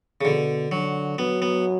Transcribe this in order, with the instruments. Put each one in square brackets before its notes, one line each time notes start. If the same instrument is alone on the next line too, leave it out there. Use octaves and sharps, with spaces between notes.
[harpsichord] C#3
[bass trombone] B2 [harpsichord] D3
[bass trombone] D3 [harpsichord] F#3
[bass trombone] F#3 [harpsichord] B3
[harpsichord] B3